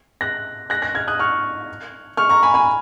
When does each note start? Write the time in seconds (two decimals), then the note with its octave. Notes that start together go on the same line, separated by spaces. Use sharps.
0.21 F#6 A#6
0.70 F#6 A#6
0.82 F#6 A#6
0.95 F6 G#6
1.07 D#6 F#6
1.19 C#6 F6
2.17 C#6 F6
2.29 A#5 C#6
2.43 G#5 B5
2.54 G#5 B5